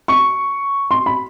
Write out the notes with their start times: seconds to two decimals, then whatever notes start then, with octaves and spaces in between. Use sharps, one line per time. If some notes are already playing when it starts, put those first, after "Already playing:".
0.08 C#6
0.91 C6
1.06 B5